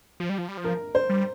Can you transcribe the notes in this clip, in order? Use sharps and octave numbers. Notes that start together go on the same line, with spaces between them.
F3
G3
F3
G3
F3
A#4
C5
G3